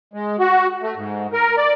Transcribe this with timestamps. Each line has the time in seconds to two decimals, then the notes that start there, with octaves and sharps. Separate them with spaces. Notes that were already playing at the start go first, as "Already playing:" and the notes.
0.14 G#3
0.39 F#4
0.82 A3
0.96 G#2
1.33 A#4
1.57 D5